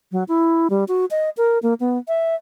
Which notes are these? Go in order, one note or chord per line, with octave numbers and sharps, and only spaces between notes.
F#3
E4
G3
F#4
D#5
A#4
A#3
B3
E5